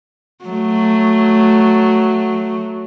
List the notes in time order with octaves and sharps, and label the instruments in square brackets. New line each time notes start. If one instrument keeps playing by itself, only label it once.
[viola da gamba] F#3 A3